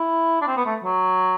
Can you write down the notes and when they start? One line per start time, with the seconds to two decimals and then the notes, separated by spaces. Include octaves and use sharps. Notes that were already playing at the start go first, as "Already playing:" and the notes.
Already playing: E4
0.41 D4
0.47 C4
0.56 B3
0.66 A3
0.84 F#3